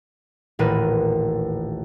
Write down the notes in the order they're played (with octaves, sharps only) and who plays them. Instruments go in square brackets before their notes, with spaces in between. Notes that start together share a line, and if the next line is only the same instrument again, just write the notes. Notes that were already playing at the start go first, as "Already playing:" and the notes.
[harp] D#1 A1 A#4 B4 D#7